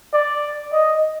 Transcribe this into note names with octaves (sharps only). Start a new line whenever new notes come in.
D5
D#5